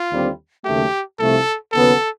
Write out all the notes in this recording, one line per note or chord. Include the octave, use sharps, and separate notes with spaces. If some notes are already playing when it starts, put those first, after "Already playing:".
Already playing: F4
D#2 D3 G3 C4
D#2 C#3 F#3 A3 G4
C2 C3 F3 A3 A4
D#2 C#3 F#3 B3 A4